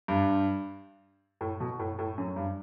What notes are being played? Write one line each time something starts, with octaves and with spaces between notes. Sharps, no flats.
G2
A2
B2
A2
A2
F#2
G2